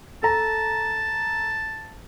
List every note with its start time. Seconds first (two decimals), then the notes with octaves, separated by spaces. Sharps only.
0.23 A4 A5 A#5